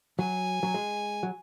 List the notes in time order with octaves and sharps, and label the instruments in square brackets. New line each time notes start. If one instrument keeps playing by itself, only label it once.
[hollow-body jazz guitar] F#3 [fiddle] G#5
[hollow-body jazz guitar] F#3
G#3
F#3